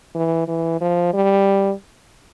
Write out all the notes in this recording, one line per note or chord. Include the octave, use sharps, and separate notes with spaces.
E3
E3
F3
G3